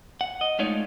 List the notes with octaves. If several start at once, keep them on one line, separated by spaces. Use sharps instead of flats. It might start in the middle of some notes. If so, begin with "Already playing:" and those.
F#5
D#5
G#3 A3 D#4 F4 C#5 D5